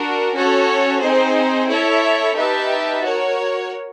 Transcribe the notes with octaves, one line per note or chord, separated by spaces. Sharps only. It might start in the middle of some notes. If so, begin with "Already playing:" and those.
Already playing: D4 F#4 A#4
C#4 F#4 A4 C#5
C4 D#4 G#4 C5
E4 A4 C#5 E5
D#4 G4 B4 E5 A5
F#4 A#4 C#5